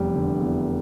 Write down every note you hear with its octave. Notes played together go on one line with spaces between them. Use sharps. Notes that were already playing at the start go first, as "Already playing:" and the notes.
Already playing: F1 E2 G3
D3
E2